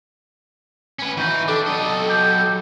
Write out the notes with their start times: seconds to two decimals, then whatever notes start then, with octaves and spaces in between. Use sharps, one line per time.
0.99 C#4 B4
1.17 E3 D#4 F#4 B4
1.48 D4 G4 A4
1.67 F#3 D#5
2.08 G4